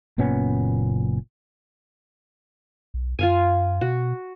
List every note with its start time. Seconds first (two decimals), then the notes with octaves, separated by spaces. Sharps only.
0.18 F#1 A#2 B3 C#4
2.94 B1
3.19 F#2 F4 F5 G#5
3.81 B2 F#4